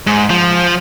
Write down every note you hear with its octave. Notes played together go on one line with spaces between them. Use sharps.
G#2
F3